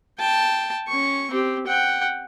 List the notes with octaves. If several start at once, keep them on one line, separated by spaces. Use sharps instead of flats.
G5 A5
C#4 C#6
C4 G4
F#5 G5